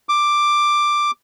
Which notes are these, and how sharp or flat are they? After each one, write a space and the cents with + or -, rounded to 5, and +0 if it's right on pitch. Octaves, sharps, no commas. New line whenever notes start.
D6 +10